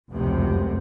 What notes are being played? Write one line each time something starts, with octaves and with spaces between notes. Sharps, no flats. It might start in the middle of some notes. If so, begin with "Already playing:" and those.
F1 C#2 F#2 C3